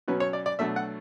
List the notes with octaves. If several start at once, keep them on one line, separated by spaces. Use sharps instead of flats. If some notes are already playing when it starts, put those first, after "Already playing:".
B2 F#3 C#4 B4
C#5
D5
D5
B2 F#3 A3 D4 E5
F#5